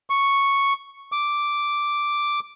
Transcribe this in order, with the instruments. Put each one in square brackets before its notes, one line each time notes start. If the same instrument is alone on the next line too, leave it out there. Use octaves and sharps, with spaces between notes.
[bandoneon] C#6
D6